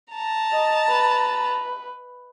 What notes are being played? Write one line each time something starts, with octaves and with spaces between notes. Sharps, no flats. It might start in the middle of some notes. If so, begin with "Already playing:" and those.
A5 A#5
D#5
B4